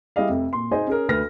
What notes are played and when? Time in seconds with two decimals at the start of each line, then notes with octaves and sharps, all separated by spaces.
0.16 G3 E4 G#4 D#5 F5
0.28 F1 F2 E5
0.53 A#2 C6
0.71 D#4 G#4 C5 D#5 G#5
0.87 C#4 G#4 A#4
1.09 D2 B4 F6 A#6